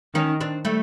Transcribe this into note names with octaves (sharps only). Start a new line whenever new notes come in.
D#3 C#4 D#4
C4 D4
G3 A3